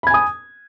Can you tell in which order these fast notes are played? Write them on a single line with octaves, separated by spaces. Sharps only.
B5 G#6 G#5 D#6